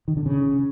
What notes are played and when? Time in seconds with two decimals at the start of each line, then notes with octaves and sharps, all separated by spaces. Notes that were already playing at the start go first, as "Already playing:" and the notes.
0.08 D#3
0.17 D3
0.26 C#3